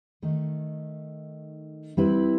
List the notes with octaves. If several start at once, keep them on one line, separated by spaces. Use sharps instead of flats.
D#3 A3 D#4
G3 C4 E4 B4